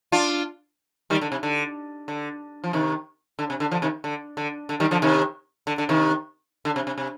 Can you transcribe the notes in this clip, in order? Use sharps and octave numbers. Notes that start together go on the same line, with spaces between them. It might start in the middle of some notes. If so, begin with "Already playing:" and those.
D4 F4
D#3 G3
D3
C3
D3
D3
F3
C3 D#3
D3
C3
D3
D3 F3
C3 D#3
D3
D3
D3
D#3 G3
D3 F3
C3 D#3
D3
D3
C3 D#3
D3
C3
C3
C3